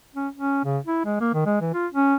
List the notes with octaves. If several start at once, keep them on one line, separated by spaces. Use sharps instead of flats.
C#4
C#4
C#3
E4
G#3
A#3
D#3
G#3
E3
F4
C#4